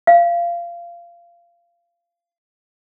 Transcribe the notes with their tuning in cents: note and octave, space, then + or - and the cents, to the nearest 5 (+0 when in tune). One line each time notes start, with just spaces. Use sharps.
F5 -20